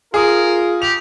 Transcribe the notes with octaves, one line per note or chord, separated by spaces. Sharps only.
F4 G#4 A#4 D#6
G4 F7